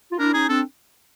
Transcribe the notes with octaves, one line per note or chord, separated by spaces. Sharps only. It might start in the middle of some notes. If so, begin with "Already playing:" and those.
F4
D4 E4 A#4
C#4 D#4 G#4
C4 D4 A4